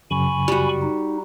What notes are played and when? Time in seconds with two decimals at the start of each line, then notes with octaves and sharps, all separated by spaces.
0.11 F#2 C#3 G#5 B5 C#6
0.48 G3 F#4
0.82 D#4